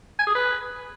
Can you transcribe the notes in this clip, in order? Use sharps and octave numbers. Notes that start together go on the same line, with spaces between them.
G#5
G#4
B4